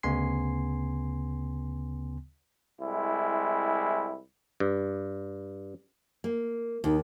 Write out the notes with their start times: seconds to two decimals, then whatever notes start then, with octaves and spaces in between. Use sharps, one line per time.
0.03 D2 C#3 B3 G#5 C6 C7
2.79 C2 G#3 E4
4.60 G2
6.24 A#3
6.84 D#2 D#4